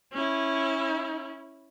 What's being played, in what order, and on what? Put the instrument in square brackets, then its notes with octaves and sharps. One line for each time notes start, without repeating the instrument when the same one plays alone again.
[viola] C#4 E4